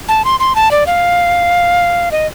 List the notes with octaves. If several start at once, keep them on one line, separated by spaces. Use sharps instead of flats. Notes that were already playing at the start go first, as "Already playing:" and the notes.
A5
C6
C6
A5
D5
F5
D#5